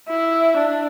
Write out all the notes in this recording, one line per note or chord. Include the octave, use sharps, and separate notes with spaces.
E4
D4